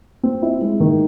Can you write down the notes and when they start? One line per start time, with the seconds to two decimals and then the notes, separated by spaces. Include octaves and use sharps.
0.23 C4
0.42 E4
0.61 G#3
0.80 D#3